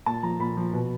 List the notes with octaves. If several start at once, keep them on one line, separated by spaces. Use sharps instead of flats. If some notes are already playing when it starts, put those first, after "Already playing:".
A#2 A5
F3 A#5
A#2 B5
F3
B2